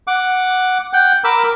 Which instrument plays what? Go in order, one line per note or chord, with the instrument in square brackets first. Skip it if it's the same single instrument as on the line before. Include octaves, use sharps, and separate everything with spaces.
[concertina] F#5 D6
F#5 G5
A#4 B5 D6 E6